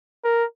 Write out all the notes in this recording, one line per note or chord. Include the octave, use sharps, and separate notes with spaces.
A#4